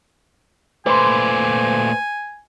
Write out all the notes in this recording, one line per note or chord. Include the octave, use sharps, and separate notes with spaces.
A#2 A3 B4 C5 G#5